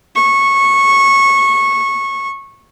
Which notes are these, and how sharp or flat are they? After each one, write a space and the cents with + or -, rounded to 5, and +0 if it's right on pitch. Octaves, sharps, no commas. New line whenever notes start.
C#6 -15